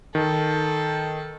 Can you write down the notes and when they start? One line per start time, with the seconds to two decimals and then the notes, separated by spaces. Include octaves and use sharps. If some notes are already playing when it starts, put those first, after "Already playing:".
0.15 D#3 A4